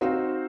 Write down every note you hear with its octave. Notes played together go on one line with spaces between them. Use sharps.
C4 D#4 F#4 C5 F5